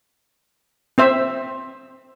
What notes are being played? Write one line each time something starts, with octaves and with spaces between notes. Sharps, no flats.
C4 C5 E5